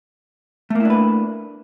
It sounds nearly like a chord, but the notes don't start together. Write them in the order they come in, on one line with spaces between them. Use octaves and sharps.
A3 A#3 E4 D4 B4